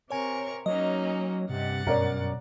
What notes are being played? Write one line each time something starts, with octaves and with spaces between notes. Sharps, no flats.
C3 A#4 C#5 G#5 C#6
F#3 A#3 C#4 D#4 D#5
G2 C3 F#5 A6
F#2 B2 A#4 C#5 D5